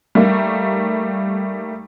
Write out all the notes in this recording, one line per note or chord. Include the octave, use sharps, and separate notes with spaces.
G3 A3 A#3 D#4